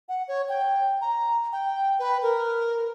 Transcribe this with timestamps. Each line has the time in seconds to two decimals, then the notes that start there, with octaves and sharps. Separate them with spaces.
0.09 F#5
0.28 C#5
0.49 G5
1.01 A#5
1.52 G5
1.99 B4
2.22 A#4